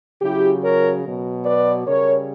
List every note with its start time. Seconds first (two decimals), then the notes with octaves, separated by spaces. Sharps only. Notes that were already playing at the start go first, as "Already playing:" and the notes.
0.22 C#3 F#3 E4 G4
0.63 A#4 C#5
1.05 B2 F#3
1.45 B4 D5
1.86 C#3 G3 A#4 C#5